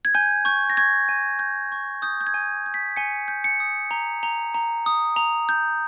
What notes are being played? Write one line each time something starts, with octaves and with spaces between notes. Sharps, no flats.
G#6
G#5 G6
C#6 G6
A#6
C#6 G#6
G#5
G6
C#6
D#6 G6
G6
G#6
G#5
G6
B6
G#5 C#7
G6
C#7
D#6
A#5
A#5
A#5
D#6
A#5
G6